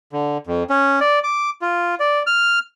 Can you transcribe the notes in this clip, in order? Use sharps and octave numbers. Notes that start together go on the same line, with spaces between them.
D3
F2
C#4
D5
D6
F4
D5
F6